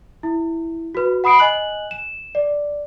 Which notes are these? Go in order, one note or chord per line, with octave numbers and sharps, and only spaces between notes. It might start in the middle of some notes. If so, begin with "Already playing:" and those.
E4
F#4 B4
F#5 B5 D#6 C7 D7
D#5 G#5 F#6 F#7
E7
D5